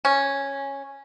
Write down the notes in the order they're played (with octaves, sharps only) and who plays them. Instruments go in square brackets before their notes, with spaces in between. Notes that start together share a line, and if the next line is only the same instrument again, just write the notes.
[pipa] C#4